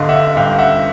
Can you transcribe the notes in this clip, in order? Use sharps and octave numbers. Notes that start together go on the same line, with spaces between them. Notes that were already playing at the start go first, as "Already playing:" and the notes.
Already playing: G1 D3 D#5 F5
E5 F#5
G2 F5 G5
E5 F#5